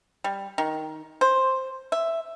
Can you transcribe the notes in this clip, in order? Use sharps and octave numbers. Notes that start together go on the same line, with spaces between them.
G3
D#3
C5
E5